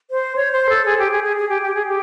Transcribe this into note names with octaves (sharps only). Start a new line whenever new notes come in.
C5
C#5
C5
A4
G#4
G4
G#4
G#4
G#4
G4
G4
G#4
G4